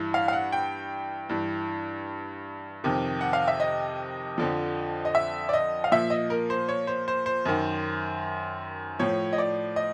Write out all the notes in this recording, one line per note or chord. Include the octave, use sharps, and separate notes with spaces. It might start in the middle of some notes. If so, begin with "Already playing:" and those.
Already playing: G2 E3
F5
F5
F#5
G5
G2 E3
F2 C3 D#3
F#5
F5
E5
D#5
F2 D3 F3
D#5
E5
D5
D#5
F5
A#2 F3 E5
D#5
A#4
C5
C#5
C5
C5
C5
F#2 D#3
A2 F3 C#5
D#5
D5
D#5